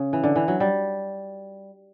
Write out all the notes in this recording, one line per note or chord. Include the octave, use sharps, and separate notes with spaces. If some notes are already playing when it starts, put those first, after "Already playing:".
Already playing: C#3
E3
D3
E3
F#3
G3